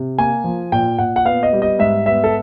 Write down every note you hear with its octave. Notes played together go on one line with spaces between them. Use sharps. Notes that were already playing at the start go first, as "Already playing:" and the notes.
Already playing: C3
A#3 G#5
F3
A#2 G5
A#2 F#5
F#5
B3 F5
D#5
G3
D#5
G#2 E5
B3 E5
A4